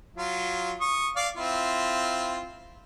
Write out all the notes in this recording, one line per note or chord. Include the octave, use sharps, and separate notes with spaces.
F#3 F4
C#6 D#6
D5 F5
C4 E4 F4